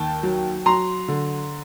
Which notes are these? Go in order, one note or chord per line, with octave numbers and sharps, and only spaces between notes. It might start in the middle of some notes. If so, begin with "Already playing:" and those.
Already playing: D#2 G5 A5
F#3
F#3 A#5 C6
D3